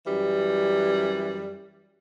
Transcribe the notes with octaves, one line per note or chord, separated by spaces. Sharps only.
F#2 E3 G3